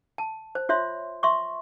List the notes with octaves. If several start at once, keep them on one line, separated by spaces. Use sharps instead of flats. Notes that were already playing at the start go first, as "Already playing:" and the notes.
A5
C5
F4 C5 C#5 E5 C6
E5 C6 C#6